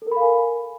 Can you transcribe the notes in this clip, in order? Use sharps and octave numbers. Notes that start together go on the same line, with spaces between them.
A4 A#4 F5 G#5 B5